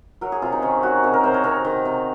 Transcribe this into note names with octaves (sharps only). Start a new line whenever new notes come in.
F#3 A#4
G#4
C3 F4
D#4
D#3 C#4
F#3 F#4
C3 A#4
A#4
C3 C5
C#5
C3 A#4
D#3
C3